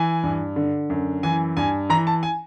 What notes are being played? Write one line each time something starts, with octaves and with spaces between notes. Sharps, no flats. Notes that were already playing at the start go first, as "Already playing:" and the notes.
Already playing: E3 G#5
G2
D3
F#2
E3 G#5
G2 G#5
E3 A#5
A5
G#5